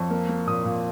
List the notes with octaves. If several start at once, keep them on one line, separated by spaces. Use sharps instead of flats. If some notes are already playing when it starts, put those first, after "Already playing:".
Already playing: F2 C#6
A#3
A#3
A#2 D#6
A#2